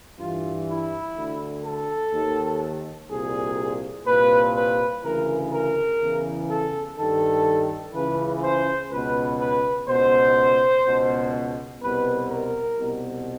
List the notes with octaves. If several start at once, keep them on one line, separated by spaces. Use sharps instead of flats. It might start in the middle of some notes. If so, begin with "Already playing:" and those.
G2 E3 F4
E4
D2 D3
A4
D#2 D#3
C2 A#2 G#4
C2 A#2 B4
B4
D2 C#3 E3 A#4
A#4
E2 C#3 E3
A4
G2 D#3 A4
C#2 C#3 E3 B4
C5
C#2 B2 B4
B4
C#2 B2 C5
C#2 B2
C2 B2 B4
A#4
C2 B2